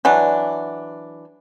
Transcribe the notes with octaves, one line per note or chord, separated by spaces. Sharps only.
E3 F#3 D4